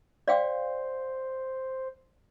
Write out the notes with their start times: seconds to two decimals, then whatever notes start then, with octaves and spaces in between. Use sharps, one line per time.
0.28 C5 D5 F5 G5